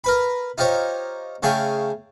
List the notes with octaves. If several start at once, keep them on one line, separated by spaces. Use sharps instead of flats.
A#4 B4 B5
D#4 F4 G4 C5 C#5
C#3 A3 G#4 C#5 F5 G5